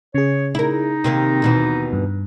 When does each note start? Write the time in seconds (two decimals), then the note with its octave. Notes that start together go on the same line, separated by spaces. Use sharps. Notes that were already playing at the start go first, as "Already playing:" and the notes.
0.15 C#3 G#4 C#5
0.55 D#4 E4 A#4
1.04 C3 D#3 A#3
1.42 D#2 B2 E3
1.93 G2